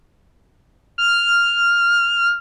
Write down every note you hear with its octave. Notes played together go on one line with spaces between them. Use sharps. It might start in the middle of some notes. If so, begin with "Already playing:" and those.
F6